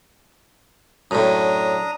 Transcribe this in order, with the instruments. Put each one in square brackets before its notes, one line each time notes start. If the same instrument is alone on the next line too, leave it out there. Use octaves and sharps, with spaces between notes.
[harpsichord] F#2 A2 [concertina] D4 A#5 D#6